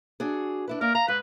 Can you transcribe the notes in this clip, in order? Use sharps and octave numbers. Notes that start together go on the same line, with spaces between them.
D4 F#4 G#4
D4 E4 B4
A#3 A#4 D5
F5 A#5
G#2 B4